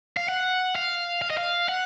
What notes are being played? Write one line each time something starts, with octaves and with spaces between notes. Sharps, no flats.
F5
F#5
F5
F5
D#5
F5
F#5